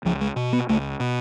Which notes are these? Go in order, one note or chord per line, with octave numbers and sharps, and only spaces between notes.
C#2 F3
G#3
B2
B3
C#2 A3
B2